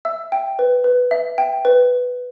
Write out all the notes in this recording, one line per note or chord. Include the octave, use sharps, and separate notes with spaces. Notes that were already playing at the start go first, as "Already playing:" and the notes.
E5 E6
G5
B4
B4
E5
G5
B4